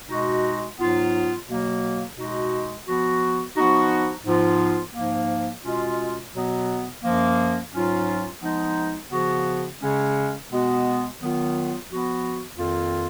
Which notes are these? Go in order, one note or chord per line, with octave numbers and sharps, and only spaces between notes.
B2 G#3 D#4 F#4
G#2 F#3 B3 F4
B2 F#3 A#3
B2 G#3 D#4 F#4
F3 B3 F#4
F3 B3 D#4 F#4
G#2 F3 B3 F4
G#2 F3 A#3
B2 G#3 C#4 F4
B2 F#3 B3
F#2 F3 A#3
G#2 F#3 C#4 F4
F3 G#3 B3 D#4
C#3 F3 B3 F#4
C#3 G#3 C#4
B2 G#3 B3 F#4
D#3 F#3 B3 F4
F3 B3 F#4
F2 D#3 A#3 F4